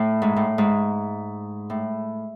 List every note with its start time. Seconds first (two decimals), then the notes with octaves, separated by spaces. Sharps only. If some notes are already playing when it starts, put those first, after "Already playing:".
Already playing: A2
0.22 G#2
0.36 A2
0.58 G#2
1.70 A2